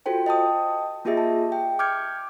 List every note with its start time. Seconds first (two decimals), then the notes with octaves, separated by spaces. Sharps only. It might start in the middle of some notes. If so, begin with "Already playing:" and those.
0.06 F4 F#4 A4 C5 G5
0.26 D#5 G5 A5 D#6
1.05 A#3 F4 G4 G#4 D#5 E5
1.17 A5
1.52 G5
1.79 D6 F6 G6 G#6 C#7